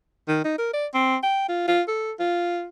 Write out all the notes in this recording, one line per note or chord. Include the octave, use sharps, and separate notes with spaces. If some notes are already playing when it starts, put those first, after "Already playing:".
D#3
D#4
A#4
D5
C4
G5
F4
F4
A4
F4